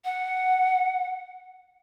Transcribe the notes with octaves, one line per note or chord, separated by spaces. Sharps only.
F#5